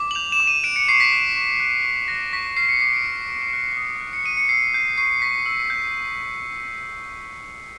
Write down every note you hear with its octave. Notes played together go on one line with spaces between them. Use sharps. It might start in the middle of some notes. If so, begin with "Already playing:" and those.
Already playing: D6
F#7
G6 F7
E7
D6
D#7
F#6 D7
C#7
C#6 C7
B6
F#6
C#6
F#6
C#6
F#6 A#6
C#6 B6
F6 C7
C#7
D6 C7
D7
F6
D6
F#6
D#6
F#6
C#7
D#6 D#7
C#7
E6 C7
G6 C7
C#6 C7
C#6 B6
E6
G6